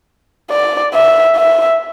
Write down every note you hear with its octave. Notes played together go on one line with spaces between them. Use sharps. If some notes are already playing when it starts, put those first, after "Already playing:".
D5
E5
E5